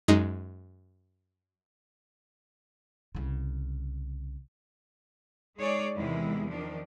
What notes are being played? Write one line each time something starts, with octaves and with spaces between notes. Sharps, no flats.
F#2 G#3 D#4
C2 C#3
G#3 D#4 G#4 C#5 D5
E2 C3 D#3 G#3 E4
D#3 F3 D4